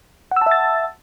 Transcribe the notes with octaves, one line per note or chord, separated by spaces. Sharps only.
E5 F#5 A5 E6 A6